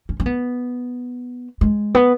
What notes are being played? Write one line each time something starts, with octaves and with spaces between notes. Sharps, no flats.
C#4
C#4
B3
G#3
B3